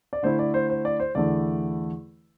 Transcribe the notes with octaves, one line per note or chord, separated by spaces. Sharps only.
D5
D3 A3 E4 C5
D5
C5
C5
D5
C5
E2 D3 A3 E4 D5